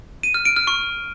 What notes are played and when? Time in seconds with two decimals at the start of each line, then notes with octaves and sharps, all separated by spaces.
0.23 D#7
0.34 F6
0.45 D7
0.56 F6
0.67 C#6